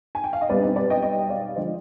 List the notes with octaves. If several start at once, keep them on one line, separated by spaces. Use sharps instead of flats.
G#5
G5
F5
D#5
B1 B2 G3 B4 D5
D4
C4 D#4
B4 D5
D#5 G5
D#5 G5
D5 F5
D3 F3 G#3 C5 D#5